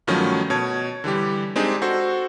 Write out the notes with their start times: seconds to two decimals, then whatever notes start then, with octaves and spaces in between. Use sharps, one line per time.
0.07 G2 D#3 F3 F#3 A3 C#4
0.50 B2 C#5 A5 G#6
1.04 D3 E3 G3 G4
1.56 G#3 C4 D4 D#4 G4 G#4
1.82 F#4 A4 C5